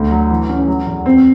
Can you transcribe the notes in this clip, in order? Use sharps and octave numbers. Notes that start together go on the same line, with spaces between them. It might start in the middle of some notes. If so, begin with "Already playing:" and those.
Already playing: D2
F#3
E3
C#4
F#3
E2
C4